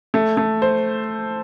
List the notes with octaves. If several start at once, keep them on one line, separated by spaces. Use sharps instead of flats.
A3
A3
C5